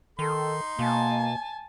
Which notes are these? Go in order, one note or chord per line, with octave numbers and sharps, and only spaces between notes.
D#3 D#4 A4 C6
B2 A#3 G#5 A5